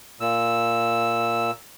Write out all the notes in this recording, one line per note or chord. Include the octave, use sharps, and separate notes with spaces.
A#2 E6